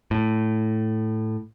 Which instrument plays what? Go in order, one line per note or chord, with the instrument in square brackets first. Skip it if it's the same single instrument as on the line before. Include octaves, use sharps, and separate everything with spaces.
[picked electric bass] A2